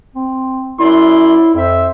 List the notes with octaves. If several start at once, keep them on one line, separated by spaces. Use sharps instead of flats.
C4
F#2 E4 D5 C6
F2 C5 E5